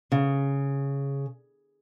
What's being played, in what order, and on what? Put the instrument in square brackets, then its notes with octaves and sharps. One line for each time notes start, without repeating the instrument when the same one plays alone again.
[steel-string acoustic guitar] C#3